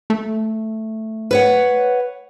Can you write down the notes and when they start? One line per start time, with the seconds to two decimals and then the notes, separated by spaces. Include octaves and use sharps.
0.10 A3
1.31 B4 C#5 F#5